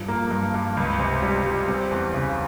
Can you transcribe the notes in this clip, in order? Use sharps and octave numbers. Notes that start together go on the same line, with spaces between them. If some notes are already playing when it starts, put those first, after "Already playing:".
Already playing: G2 F3
A#3
G2
G2
C#2
C3
G3
G3
C4
E2
C#3